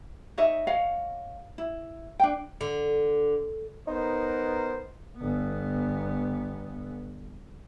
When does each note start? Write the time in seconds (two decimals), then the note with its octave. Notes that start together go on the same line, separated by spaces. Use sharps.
0.38 D#4 C#5 D#5 E5
0.67 C#5 D#5 F5 F#5
1.58 E4
2.20 D4 G5
2.61 D3
3.88 B3 D#4 A#4 C5
5.17 G1 B3